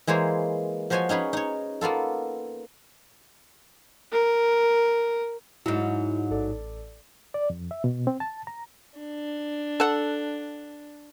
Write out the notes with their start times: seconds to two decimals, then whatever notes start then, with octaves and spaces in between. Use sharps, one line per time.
0.07 E3 G#3 A#3 C5 C#5
0.90 F3 F#4 C5 C#5 D#5 G#5
1.09 C#4 D#4 G#4 B4
1.33 D#4 C#5
1.81 A#3 B3 F4 A4
4.12 A#4
5.66 G#2 F#3 E4
6.31 A1 A4 D5
7.34 D5
7.50 F2
7.71 E5
7.84 B2
8.07 C4
8.20 A5
8.47 A#5
8.98 D4
9.80 A4 F#5